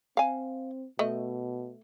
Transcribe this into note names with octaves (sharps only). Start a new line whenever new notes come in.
C4 F5 G#5
B2 A3 D#5